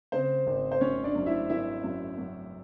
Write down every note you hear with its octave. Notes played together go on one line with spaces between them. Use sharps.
C#3 C4 C5
G#1
C5
G#1 C#4 C#5
D4 D5
F#2
E4 E5
G#1 E4 E5
F#2
F#2